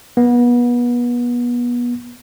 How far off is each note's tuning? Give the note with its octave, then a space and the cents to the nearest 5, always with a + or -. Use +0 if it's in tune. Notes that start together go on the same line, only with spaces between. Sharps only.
B3 -30